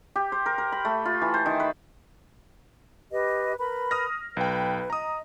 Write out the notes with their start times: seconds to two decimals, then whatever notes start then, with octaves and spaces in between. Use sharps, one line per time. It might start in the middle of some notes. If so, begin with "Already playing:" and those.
0.16 G4
0.32 C5
0.46 A#4
0.58 A#4
0.72 B5
0.85 A3
1.05 F4
1.22 E3
1.34 C5
1.46 D#3
1.60 B4
3.11 G4 B4 D#5
3.58 A#4 B4 B5
3.91 D#6 F6 A#6
4.37 B1 B4 G5
4.90 D#5 A#5 D#6